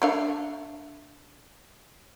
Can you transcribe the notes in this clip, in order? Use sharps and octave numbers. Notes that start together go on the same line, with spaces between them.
A3 D4 F5